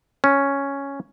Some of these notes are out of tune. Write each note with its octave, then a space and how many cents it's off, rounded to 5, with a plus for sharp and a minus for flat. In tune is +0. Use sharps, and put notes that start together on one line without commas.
C#4 +0